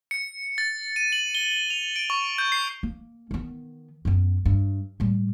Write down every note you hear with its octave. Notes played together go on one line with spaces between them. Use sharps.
C#7
A6
D#7
F#7
G7
F7
D7
C#6
G6
C7
A#3
D#3 B3
F#2 B3
G2
A2 G3